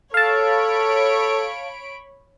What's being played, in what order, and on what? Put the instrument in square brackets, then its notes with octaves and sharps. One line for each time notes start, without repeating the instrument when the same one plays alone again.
[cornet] A4 [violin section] C#5 B5 D7 [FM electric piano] F5 A5